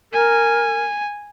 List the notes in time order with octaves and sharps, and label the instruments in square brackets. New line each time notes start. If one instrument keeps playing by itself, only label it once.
[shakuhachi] A#4 [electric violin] G#5